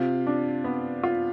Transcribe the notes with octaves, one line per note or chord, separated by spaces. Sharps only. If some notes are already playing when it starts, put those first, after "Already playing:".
Already playing: C3 F4
D4
B3
F4